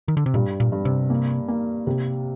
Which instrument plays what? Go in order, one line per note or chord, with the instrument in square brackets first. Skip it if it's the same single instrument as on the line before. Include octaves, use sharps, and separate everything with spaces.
[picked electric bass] D#3
D3
C3
[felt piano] G2 [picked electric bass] A#2
[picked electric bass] A#2
[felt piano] G2
[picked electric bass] C3
[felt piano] A#3
A#3
C3